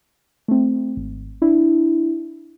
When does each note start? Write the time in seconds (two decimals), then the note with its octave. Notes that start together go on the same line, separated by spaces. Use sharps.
0.48 A3 C4
0.97 G#1
1.42 D4 E4